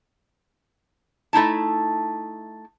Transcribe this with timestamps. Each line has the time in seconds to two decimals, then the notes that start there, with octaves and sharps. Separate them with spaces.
1.33 A3 D#4 E4 A5